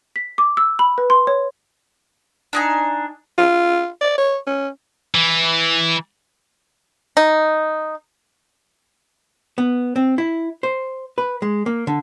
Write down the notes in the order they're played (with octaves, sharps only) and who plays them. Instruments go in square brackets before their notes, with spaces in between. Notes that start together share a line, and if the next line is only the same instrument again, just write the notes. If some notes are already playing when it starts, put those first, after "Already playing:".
[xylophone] B6
D6
E6
B5
B4
C6
C#5
[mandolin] D4 D#4 G#5
[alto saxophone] F4
D5
C#5
C#4
[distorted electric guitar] E3
[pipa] D#4
[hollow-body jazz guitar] B3
C4
E4
C5
B4
G#3
A#3
D3